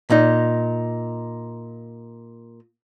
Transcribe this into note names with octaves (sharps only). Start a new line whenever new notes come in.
A#2 D#4